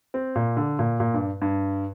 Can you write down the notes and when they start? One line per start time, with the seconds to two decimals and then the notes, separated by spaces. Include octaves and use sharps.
0.14 C4
0.35 A#2
0.57 D3
0.79 A#2
1.00 A#2
1.14 G2
1.42 G2